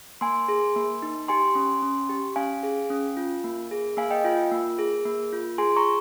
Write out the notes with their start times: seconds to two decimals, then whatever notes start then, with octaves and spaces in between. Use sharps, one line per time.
0.21 A#3 G#5 C6
0.48 G#4
0.76 A#3
1.02 D#4
1.28 G4 G#5 C6
1.55 C#4
1.82 C#4
2.09 G4
2.36 C#4 F5 G#5
2.63 G#4
2.90 C#4
3.17 F4
3.44 A#3
3.71 G#4
3.97 A#3 F5 G#5
4.11 D#5 G5
4.24 F4 F5 G#5
4.51 A#3
4.78 G#4
5.05 A#3
5.32 F4
5.58 G#4 G#5 C6
5.76 A#5 C#6